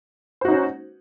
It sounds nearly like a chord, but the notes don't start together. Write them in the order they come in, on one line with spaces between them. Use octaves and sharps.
C5 F#4 D#4 C#4